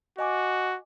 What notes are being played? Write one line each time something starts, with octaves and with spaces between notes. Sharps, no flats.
F#4 D#5 G#5 D6